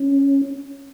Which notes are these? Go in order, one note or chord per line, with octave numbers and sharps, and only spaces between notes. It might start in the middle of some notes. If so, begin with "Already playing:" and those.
Already playing: C#4